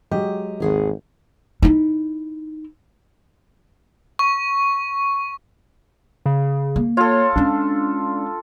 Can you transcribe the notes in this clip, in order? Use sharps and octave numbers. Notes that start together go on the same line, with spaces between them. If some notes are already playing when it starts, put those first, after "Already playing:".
F#3 G#3 G4 D#5
G#1 D#2 G#4 F#5
D#4 E4
C#6
C#3
A#3
F4 A4 C#5
G#3 C#4 D4